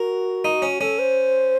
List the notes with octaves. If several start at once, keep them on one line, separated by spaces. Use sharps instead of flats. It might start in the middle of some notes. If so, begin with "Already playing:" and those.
Already playing: F#4 A#4
D#4
C#4
C#4 A4
C5